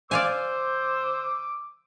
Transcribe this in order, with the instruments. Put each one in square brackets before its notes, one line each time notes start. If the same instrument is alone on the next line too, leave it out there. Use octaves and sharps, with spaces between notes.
[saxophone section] C5 [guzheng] D5 F5 G#5 [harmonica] D6 E6